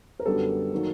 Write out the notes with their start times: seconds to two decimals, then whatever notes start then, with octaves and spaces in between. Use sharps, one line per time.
0.20 A#4
0.26 F#2 D3 G3 B3 A4
0.73 D#3 F#3 A#3